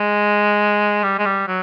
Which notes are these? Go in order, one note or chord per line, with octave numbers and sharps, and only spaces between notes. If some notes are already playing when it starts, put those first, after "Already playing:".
Already playing: G#3
G3
G#3
G3
F#3